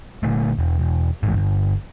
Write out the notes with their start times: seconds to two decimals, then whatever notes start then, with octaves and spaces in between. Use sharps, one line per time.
0.23 A#2 D3 A3
0.59 E1
0.79 E1
1.23 E1 A1 G#2
1.37 G1